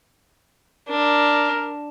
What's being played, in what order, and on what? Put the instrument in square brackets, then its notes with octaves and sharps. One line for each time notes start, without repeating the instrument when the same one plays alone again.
[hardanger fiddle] D4 [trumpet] A#4